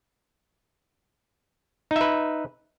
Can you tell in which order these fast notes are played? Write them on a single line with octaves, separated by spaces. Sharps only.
D#4 E5 B4